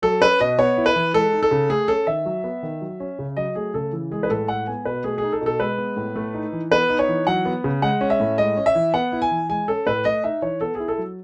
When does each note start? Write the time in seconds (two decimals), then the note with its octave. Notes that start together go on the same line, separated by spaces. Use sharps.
0.02 F#3 A4
0.21 C#4 B4
0.40 B2 D#5
0.59 B3 C#5
0.77 E4
0.86 B4
0.95 E3
1.14 G#3 A4
1.33 D#4
1.43 A4
1.51 C#3
1.70 A3 G#4
1.88 C#4 A4
2.07 D#3 E5
2.26 F#3
2.44 B3
2.63 D#3
2.81 F#3
3.00 C#4
3.19 C#3
3.37 F#3 D#5
3.55 A3 G#4
3.74 C#3 A4
3.92 E3
4.11 G#3 G#4
4.23 B4
4.30 A2 A4
4.48 G#3 F#5
4.67 B3 G#5
4.85 B2 B4
5.04 A3 G#4
5.18 D#4 G#4
5.32 A4
5.41 B2
5.46 A4
5.60 G#3 B4
5.78 B3
5.97 A2
6.16 A3
6.34 D#4
6.52 E3
6.71 B3 B4
6.89 D#4
6.99 C#5
7.08 E3
7.27 F#3 F#5
7.45 B3
7.64 C#3
7.82 G#3 F#5
8.01 C#4
8.10 E5
8.20 A2
8.38 G#3 D#5
8.57 C#4
8.66 E5
8.75 E3
8.94 B3 F#5
9.12 E4
9.22 G#5
9.31 E3
9.50 G#3 G#5
9.68 C#4 A4
9.87 A2 B4
10.05 A3 D#5
10.24 D#4 E5
10.42 E3 C#5
10.61 B3 A4
10.75 E4 G#4
10.88 A4
10.98 F#3